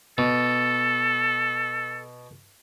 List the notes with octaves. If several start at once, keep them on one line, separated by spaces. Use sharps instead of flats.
B2 A4